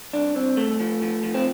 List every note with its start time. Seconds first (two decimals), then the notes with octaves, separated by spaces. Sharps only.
0.13 C2 D4
0.35 C2 C4
0.57 C2 A3
0.80 F3
1.02 F3
1.23 F3
1.34 C4